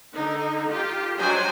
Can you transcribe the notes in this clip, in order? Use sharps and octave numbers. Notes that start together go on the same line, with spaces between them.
D3 D#4
F4 G4
F#3 D4 C5 D#5 G5 G#5